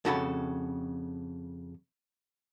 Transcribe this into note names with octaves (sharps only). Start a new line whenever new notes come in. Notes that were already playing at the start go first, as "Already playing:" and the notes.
F2 C#3 F#4 A4 A#5 B5